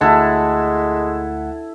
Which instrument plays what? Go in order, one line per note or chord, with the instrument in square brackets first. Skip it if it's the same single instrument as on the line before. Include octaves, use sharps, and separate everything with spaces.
[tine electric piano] D2 F#5 [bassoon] G#3 [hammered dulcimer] E4 A4